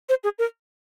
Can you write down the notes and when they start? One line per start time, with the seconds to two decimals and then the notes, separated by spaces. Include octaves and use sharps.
0.09 C5
0.24 G#4
0.39 A#4